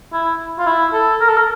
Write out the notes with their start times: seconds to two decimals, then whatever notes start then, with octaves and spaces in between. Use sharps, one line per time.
0.13 E4
0.58 F4
0.66 E4
0.93 A4
1.20 A#4
1.29 A4
1.37 A#4